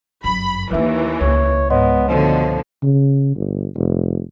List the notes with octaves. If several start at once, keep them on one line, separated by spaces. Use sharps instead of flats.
G1 F#2 B5
D#2 E3 F3 D#4 B4 E5
C#2 C#5
G#2 B3 C#5 D#5 C6
B2 D3 F3 A3
C#3
G1
F1